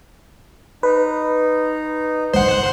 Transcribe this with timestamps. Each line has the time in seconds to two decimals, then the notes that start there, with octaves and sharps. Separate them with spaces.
0.83 D#4 B4
2.34 G#1 C#2 C5 F#5 C6